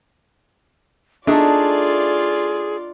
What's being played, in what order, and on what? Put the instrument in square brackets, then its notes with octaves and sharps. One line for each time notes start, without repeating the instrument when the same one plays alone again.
[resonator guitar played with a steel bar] A3 [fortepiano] D4 D#4 [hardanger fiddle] F4 D5 [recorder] G#4